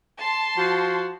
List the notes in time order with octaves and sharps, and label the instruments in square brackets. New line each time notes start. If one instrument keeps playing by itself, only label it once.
[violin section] A5 C6
[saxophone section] F3 F#4